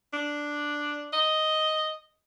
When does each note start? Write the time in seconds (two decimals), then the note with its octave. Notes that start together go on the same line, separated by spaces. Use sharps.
0.13 D4
1.13 D#5